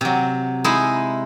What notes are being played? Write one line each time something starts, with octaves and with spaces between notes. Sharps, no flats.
C3 F#3
G#3 D#4 E4